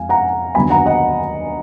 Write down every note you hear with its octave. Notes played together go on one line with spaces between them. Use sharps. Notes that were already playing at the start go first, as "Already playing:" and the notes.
Already playing: F2 F3 G#3 F5 G#5
F#5 A#5
D#2 D3 F#3 B3 G#5 B5
F#5 A#5
D#5 F#5